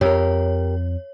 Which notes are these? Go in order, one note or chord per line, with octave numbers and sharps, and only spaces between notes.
F2 G4 A#4 C#5